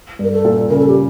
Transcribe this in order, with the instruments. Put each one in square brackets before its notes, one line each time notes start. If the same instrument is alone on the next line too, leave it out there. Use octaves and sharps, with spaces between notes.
[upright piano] G2 [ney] A#4
[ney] A4
[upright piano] A#2
[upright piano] C#3 [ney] A#4
[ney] A4
G4